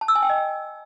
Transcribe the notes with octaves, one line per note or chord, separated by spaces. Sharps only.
A5
E6
G#5
G5
D#5